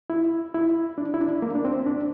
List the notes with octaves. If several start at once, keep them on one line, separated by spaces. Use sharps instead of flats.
E4
E4
D4
E4
D4
A#3
D4
C4
D4